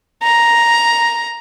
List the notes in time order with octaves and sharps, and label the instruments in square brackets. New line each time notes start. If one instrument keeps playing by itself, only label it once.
[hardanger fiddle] A#5